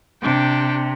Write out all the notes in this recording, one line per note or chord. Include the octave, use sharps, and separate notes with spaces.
C3 D4 G5